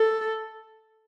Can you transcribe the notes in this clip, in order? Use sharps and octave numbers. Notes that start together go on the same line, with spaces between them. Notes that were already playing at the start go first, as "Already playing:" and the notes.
Already playing: A4